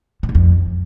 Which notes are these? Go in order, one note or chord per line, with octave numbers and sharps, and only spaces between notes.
A2
G#2
F2